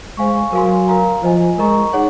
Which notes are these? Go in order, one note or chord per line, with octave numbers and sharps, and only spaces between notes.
G#3 C5 F5 G#5 C#6
F#3 A#4 F5 G#5 C6
A#4 F5 A#5
F3 C5 D#5 G#5
G#3 A#4 D#5 A#5 C#6
D#4 G#4 C#5 F#5